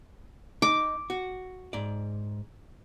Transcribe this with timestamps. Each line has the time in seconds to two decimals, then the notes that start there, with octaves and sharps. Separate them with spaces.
0.62 D#4 D6
1.10 F#4
1.73 G#2 D5